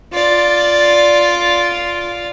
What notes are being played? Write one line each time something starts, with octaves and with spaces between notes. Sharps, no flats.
F4 D5